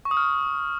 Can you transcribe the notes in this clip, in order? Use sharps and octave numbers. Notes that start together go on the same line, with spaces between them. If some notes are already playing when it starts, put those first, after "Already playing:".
C#6
D#6
F6